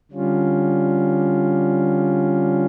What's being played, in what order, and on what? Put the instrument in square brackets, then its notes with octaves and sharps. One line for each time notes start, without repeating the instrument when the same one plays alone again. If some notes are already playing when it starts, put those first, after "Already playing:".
[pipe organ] D3 G3 C#4 F4